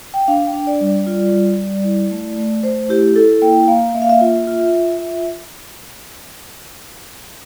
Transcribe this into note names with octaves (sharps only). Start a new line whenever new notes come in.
G5
D4 F5
G5
D4
D5
G3
D5
F4
G3
G3
E4
A3
A3
A3 C5
E4 G4
E4 A4
A#3 G5
A#3 F5
A#3 E5
F5
E5
F4
F4
F4
F4 E5